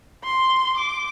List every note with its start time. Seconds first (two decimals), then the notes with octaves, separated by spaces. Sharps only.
0.24 C6
0.77 D6